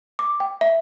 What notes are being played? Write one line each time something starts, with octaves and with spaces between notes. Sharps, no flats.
D6
G5
E5